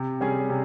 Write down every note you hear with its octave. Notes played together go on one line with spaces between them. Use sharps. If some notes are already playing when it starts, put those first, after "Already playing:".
Already playing: C3
G3 C#4 G#4
C3